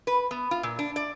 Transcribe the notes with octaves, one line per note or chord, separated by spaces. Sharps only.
B4
B3
F4
A#2
D4
D5